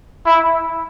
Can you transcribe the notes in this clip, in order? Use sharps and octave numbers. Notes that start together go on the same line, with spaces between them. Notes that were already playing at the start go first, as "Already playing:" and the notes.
E4